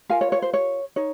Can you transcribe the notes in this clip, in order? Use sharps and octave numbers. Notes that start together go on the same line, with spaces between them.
F4 A#4 F5 G#5
C#5
C#5
C5
C#5
D#4 C#5